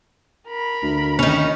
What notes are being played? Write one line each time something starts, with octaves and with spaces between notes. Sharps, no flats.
A#4 B5
D2
D#3 C#4